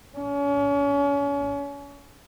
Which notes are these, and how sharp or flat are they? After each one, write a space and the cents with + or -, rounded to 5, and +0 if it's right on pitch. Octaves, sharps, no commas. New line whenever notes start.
C#4 +35